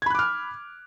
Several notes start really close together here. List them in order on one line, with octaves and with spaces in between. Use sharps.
G#6 B5 F#6 D6 F6